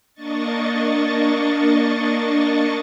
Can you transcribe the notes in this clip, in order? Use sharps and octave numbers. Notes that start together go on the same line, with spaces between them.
A#3 D4 D#5 C#6 A6